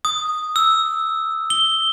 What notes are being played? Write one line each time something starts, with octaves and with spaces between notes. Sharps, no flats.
D#6
E6
G7